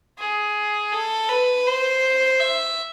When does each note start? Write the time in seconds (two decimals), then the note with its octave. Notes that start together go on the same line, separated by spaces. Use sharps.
0.19 G#4
0.92 A4
1.29 B4
1.66 C5
2.40 E5